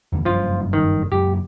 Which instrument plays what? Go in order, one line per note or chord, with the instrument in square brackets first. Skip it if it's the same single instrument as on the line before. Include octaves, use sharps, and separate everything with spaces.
[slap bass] E2 D3 E3
[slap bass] F#1 G2 C#4 [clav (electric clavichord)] F3 F4
[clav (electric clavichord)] D#3
[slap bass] F#2 A#2 C#3 [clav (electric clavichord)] G4